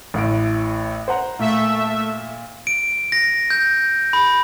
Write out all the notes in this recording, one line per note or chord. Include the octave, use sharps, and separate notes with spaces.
A1 A2 D7
C5 F#5 A#5
A#2 A3 E5
D7
A#6
G6
B5